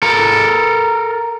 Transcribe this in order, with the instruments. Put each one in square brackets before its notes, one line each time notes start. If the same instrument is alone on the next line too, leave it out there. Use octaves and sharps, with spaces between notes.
[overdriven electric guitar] A4 A#4